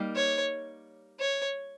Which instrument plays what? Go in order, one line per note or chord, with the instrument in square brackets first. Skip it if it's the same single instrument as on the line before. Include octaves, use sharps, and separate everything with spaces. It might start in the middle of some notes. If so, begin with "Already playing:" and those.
Already playing: [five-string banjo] G3 A#3 D#4
[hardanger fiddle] C#5
C#5